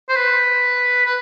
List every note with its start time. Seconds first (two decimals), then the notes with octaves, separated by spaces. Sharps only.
0.09 C5
0.16 B4
1.06 B4